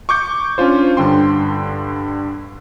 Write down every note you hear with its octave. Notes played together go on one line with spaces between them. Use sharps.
C#6 D6 G6 C#7
C#4 D4 F4 C5
G2 D3 G5 C6